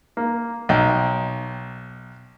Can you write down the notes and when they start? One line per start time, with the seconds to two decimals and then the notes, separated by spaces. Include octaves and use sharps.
0.17 A#3
0.69 B1 D#5 G5